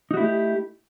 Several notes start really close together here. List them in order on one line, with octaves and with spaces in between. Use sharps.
D#4 F#4 E4 A3 G4